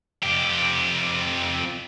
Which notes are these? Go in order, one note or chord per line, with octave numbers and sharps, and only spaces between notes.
F2 G4